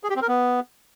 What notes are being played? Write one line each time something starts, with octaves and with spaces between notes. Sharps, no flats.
G#4
G4
C4
A#4
B3